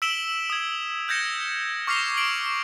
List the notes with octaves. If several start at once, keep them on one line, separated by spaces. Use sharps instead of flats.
E6 B6 D7 E7 F#7 G7
D#6 G#6
F6 G6 G#6 A#6 C#7 E7
C#6 D6 F6 A#6 C7 F7
D7 F#7